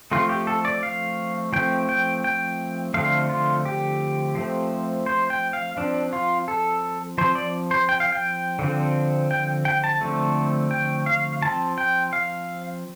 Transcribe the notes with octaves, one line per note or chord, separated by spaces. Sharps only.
F3 A3 C4 F4
G4
A4
D5
F5
F3 A3 C4 G5
G5
G5
D3 F3 A3 C4 F5
F4
G4
F3 A3 C4
C5
G5
F5
F3 C4 D4
F4
A4
F3 C4 C5
D5
C5
G5
F5
G5
D3 F3 C4
G5
G5
A5
D3 F3 A3 C4
G5
F5
F3 C4 A5
G5
F5